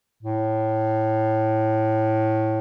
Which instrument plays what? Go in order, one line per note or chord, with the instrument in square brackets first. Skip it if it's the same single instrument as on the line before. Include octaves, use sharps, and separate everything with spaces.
[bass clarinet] A2